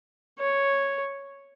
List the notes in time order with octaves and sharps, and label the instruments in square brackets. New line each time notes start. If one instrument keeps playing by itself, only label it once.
[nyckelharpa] C#5